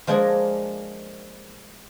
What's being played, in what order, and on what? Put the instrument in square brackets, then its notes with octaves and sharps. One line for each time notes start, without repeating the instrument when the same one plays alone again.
[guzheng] F3 G#3 A#3 D4 G#4 A#4